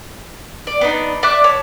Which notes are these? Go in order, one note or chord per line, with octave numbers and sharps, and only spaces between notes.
D5
B3 D4 D#4
D5 E5 D6 F#6
C#5 A5